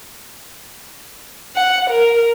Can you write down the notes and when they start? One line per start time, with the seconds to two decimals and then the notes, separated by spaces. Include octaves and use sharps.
1.56 F#5
1.89 A#4